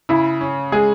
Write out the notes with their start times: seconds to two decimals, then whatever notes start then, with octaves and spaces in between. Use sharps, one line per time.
0.09 C#3 E4
0.41 C#4
0.72 G#3 G#4